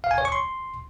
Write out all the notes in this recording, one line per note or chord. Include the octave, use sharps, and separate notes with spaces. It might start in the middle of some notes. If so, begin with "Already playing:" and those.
F5
G#5
C#5
C#6
C6